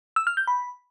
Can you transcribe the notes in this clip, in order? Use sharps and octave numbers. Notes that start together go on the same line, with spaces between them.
E6
F6
G6
B5